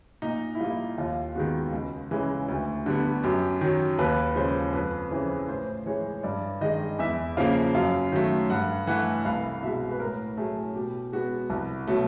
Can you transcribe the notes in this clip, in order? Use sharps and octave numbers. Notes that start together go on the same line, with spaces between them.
A#2 D#4
E4
G3 A#3 F4
D#2 F4
D#3 G#3 B3 F#4
C#2
C#3 E3 G#3
D2
D3 G3 B3
F#2 G4
D#3 F#3
D#2 B4
C#3 F3 G#3 C5
F2 B4
C#3 E3 C5
A2 C5
E3 G#3 C#5
G2 D5
D#3 G#3 D#5
E2 E5
C#3 F3 A#3 F5
F#2 F5
D#3 F#3 A3
G2 F#5
E3 A3 F#5
C2 F5
B2 G#3 E5
B4
A2 A#4
F#3 A3 G#4
B2 G4
G#3 B3 F#4
C2
B2 F#3 A3